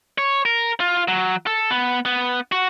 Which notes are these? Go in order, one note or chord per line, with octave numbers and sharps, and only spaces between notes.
C#5
A#4
F4
F#3
A4
B3
B3
F#4